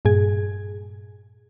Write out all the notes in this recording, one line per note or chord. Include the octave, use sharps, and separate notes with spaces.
G2 A#2 G#4 G#6